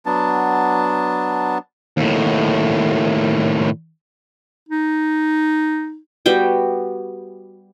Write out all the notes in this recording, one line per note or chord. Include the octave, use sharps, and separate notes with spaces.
F#3 B3 D4 A5
D#2 A2
D#4
G3 B3 F#4 G5